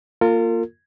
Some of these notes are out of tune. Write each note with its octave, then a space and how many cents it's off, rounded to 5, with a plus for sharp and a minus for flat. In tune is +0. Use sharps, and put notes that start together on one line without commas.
A#3 +0 F4 +0 A#4 -40